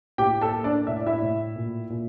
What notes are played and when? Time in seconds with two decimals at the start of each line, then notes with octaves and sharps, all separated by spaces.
0.18 A2 G4 G5
0.42 A4 A5
0.53 A#3
0.64 D4 D5
0.87 A2 E5
0.97 D5
1.06 E4 E5
1.22 A2
1.56 A#2
1.90 A#2